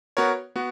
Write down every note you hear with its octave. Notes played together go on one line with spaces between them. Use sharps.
B3 F#4 A#4 C#5
B3 F#4